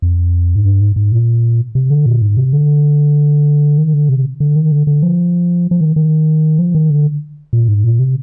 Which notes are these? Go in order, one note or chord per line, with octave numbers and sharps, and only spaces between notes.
F2
G#2
G2
G#2
G#2
A#2
C3
D3
A#2
G#2
C3
D3
D#3
D3
C3
D3
D#3
D3
D3
F3
F3
D#3
D#3
F3
D#3
D3
A#2
G#2
A#2
C3